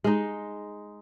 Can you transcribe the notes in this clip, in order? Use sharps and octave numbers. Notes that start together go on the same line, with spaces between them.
G#3 D#4